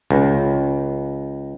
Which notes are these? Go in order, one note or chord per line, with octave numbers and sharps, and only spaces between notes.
C#2